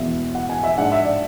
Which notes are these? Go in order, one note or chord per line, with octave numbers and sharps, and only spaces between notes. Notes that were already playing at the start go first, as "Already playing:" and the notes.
Already playing: E2 B2 G#3 B3 E5
F#5
G#5
E5
G#2 G#3 D4 F#5
E5
D5